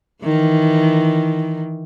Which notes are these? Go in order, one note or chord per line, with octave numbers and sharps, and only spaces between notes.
D#3 E3